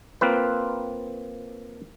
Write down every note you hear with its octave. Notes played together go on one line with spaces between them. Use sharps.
A#3 C4 F4 B4